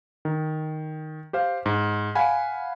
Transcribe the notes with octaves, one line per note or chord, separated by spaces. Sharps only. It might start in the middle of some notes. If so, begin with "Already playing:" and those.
D#3
G4 C5 F5
G#2
F5 F#5 G#5 B5